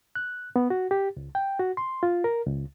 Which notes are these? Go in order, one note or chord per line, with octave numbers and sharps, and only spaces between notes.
F#6
B3
F#4
G4
C#2
G5
F#4
C6
F4
A#4
C#2